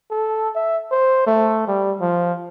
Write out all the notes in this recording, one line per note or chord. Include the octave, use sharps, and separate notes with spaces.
A4
E5
C5
A3
G3
F3